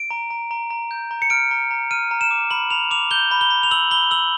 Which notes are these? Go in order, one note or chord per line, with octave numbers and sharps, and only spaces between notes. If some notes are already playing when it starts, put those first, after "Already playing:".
Already playing: D7
A#5
A#5
A#5
A#5
G6
A#5
C#7
F6 D7
A#5
A#5
F6 D#7
A#5
E7
D6
B5 F#7
B5 F7
D6 F7
G6 G7
B5
G7
B5
F7
E6 F#7
B5 G7
E6 F#7